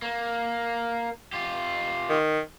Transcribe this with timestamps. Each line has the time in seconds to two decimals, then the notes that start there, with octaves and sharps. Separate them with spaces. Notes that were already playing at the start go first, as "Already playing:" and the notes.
0.02 A#3
1.33 F4 G4
2.10 D#3